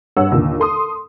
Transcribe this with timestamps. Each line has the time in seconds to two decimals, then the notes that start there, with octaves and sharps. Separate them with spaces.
0.17 G2 C#5 F#5 E6
0.32 D#2 A#2 D3
0.60 A4 C6 D#6